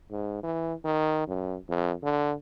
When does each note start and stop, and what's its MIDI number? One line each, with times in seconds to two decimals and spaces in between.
0.11 0.39 44
0.43 0.74 52
0.85 1.24 51
1.28 1.57 42
1.69 1.94 41
2.03 2.34 50